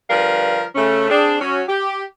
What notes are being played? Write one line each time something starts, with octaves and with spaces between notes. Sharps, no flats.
D3 F3 G3 A#4 B4 F5
C#3 A3 C#4
C4 D4 G#4
F#3 C#4 F#4
G4